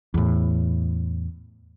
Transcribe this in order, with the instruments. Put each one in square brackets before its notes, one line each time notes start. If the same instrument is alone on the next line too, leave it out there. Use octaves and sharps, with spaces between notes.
[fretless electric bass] E2 A2